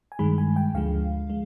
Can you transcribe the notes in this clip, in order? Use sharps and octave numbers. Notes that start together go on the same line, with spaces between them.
G#5
G2 D#3 G#3 B5
G#5
G5
D2 D3 F3 G#3 F5
G#3